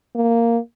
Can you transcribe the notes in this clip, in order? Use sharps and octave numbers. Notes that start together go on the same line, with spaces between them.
A#3